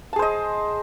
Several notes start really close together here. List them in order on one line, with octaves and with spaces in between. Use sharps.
A5 G#4 C5 D#5